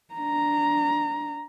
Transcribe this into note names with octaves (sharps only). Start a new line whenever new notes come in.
D4 A#5